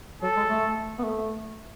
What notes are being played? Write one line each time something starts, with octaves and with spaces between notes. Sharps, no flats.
F#3 A4
G#3
A3
B3
A3